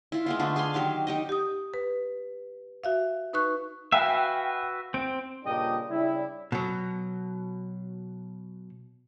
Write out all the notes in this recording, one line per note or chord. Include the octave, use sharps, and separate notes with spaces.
E4 F4
G#3 B3 F4
D3 A3 D4 F4
G#4 F5 G#5 C6
D#3 F#3 G4 F5
D#4 G4 D#5
G4 D#6
B4
F#4 E5 F5
D#4 B4 C#6 F#6
F#4 B4 E5 F5 G5 G#5
C4 D7
G2 A#2 C#3 D4 D#5 G5
C#3 G3 D4 E4
B2 F#3